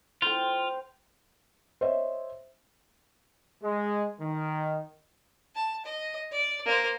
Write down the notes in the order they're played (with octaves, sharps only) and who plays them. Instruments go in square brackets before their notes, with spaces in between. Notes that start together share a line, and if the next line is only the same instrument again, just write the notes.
[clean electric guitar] F4 [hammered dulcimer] C5 G5
[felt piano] C5 C#5 D#5 E5
[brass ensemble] G#3
D#3
[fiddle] A5
D#5
D5
A#3 C5